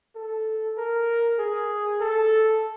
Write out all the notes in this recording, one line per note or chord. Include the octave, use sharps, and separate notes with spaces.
A4
A#4
G#4
A4